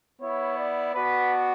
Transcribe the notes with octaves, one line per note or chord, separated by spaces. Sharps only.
B3 E4 C#5
D5
B3 D4 F#4 B4